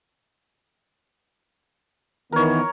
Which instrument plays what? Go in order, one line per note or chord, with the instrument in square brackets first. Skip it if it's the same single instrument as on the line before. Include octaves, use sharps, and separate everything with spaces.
[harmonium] D#3 E3 B3 [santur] A#4 C#5